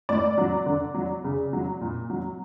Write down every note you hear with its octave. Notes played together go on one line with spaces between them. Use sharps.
A2 D5
F#3
D3
F#3
C#3
F#3
A#2
F#3